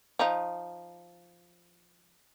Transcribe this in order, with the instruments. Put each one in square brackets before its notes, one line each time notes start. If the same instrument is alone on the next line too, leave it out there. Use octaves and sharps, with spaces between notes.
[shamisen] F3 D#4